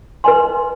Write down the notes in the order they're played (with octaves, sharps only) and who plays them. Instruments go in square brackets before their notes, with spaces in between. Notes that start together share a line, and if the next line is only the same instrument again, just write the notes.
[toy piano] B4 D#5 G#5 C6